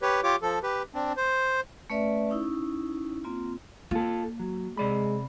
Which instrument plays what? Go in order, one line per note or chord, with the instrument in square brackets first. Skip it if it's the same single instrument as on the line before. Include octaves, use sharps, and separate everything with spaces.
[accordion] G4 B4 C#5
F4 G4 C#5 D6
F3 A4
G4 B4
C4 D4
C5
[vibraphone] A3 C#4 B4 D5 E5
C#4 D#4 E4
A#3 C4 F4
[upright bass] A#3 [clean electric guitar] F4 A4
[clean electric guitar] F#3
[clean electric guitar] C3 D5 B5 [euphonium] G#3